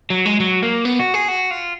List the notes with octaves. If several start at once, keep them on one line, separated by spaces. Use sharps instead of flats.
F#3
G#3
F#3
A#3
B3
F#4
G#4
F#4
F4